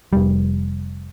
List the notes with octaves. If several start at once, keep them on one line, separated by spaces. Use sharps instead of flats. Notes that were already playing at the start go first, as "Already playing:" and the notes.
F1 G3